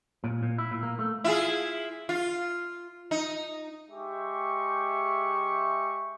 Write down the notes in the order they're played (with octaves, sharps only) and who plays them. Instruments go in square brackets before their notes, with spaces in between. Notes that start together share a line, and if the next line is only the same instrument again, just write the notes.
[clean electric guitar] A#2
A#2
E4
A#2
A#3
A3
[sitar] E4 F4 G#4
F4
D#4
[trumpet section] G#3 G4 E5 C#6